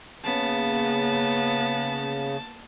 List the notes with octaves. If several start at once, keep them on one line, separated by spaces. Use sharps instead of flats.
C#3 A#3 B3 A5